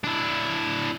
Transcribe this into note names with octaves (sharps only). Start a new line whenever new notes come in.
D4 E4